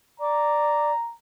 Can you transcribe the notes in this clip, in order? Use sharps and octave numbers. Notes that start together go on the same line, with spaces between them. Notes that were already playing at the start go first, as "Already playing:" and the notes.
D5 A#5 D6